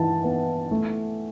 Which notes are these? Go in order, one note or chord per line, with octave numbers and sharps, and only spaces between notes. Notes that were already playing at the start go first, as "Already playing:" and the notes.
Already playing: G2 E3 A5
B3
A3